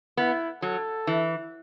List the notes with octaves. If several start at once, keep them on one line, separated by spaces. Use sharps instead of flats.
B3 E4
F#3 A4
E3